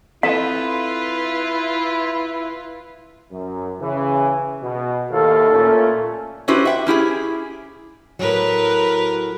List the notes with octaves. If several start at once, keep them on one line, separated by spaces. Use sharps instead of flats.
C4 E4 F4 A4 B4 D#5 F5
F#2
C#3 E3
B2
D#2 A2 A4 F5
A#2 A3 C#4
C#4 E4 F#4 G4 B4 C5
E5 F#5 G5
C#4 E4 G4 G#4
A2 F#3 A#4 B4